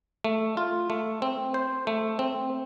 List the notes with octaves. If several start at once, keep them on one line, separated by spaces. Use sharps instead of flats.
A3
F4
A3
C4
C5
A3
C4